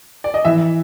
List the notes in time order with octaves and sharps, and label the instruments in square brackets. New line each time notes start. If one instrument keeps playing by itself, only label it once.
[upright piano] D5
D#5
E3 E5